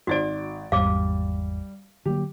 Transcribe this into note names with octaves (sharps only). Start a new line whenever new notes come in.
G#1 F#4 D5 A6 D7
G#1 E2 G#2 G3 F5 D6
D3 F#3 A#3 G4